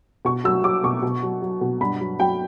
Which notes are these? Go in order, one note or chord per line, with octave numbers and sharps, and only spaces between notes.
B2 C#6
F#3 E6
F#3 D6
B2 C#6
B2
F#3
F#3
B2
G2 B5
F#3
F#3 G5